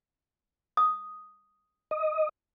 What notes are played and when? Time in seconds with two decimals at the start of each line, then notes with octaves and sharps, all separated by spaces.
0.77 D#6
1.91 D#5